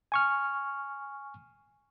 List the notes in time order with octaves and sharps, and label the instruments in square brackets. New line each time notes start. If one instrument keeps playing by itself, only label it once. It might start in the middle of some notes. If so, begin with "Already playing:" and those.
[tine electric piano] G#5 C#6 F6